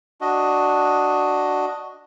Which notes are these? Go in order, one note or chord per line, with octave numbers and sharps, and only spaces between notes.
D4 F#4 D#5